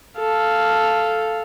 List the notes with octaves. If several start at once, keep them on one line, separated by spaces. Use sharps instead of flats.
A4 F5